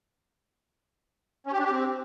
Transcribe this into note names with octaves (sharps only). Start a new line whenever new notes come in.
C#4
G4
D4
G4
C4